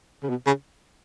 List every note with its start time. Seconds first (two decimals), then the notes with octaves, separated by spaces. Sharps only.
0.23 C#3
0.29 B2
0.47 C#3